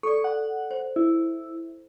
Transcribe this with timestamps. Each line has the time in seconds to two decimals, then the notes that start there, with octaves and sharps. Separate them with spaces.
0.03 A4 D5 C#6
0.24 F#5
0.71 C5
0.96 E4